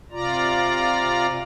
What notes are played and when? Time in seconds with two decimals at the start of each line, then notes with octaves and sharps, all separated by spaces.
0.11 C3 F4 D5 A#5